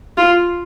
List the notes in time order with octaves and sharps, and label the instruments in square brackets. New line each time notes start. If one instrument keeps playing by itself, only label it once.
[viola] F4